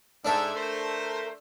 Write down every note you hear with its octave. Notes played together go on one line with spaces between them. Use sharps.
G#2 D4 A4 E5
A3 A#4 C5